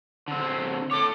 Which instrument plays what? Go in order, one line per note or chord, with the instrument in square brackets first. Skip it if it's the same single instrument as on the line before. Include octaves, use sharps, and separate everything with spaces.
[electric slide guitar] D3 C4
[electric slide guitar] A4 C#5 [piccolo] D6